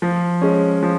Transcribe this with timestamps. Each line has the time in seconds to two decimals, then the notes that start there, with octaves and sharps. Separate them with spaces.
0.02 F3
0.42 G#3 C#4
0.83 F3